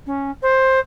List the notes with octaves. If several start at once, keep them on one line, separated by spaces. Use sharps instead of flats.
C#4
C5